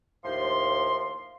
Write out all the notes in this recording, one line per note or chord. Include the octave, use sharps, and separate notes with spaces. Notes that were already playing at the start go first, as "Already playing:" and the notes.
D#2 A2 F3 C6